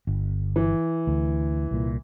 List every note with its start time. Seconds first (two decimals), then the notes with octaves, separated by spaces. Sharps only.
0.07 G1
0.56 E3
1.07 D2
1.71 C2 A#2